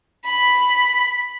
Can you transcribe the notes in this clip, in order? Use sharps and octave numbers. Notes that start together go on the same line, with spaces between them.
B5